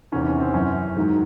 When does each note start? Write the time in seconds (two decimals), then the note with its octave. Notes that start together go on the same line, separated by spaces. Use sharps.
0.12 E2 C3 D#3 C#4
0.26 C#4
0.40 C4
0.54 F#2 E3 C#4
0.97 G#2 D#3 F#3